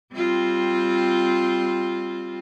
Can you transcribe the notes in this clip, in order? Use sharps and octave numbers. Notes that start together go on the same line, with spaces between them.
G3 C4 F4